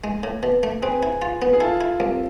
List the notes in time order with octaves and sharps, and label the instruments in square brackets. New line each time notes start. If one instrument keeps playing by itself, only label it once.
[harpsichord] G#3
A2
B2
A3
[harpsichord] C4 [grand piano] G#4 B4
[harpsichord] E4
F4
B3
[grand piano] G#4
[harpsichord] E4 [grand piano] F4 A4
[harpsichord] E4
C2